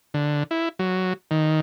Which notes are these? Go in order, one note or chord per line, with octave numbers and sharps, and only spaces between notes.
D3
E4
F#3
D#3